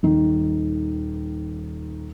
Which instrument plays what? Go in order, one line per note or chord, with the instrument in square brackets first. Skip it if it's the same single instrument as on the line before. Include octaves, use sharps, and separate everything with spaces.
[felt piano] D#1 D#3